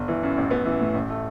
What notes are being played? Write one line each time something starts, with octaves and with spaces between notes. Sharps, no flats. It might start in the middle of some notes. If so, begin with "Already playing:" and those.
Already playing: G1
E3
F#2
A1
B3
E3
A2
A1
A3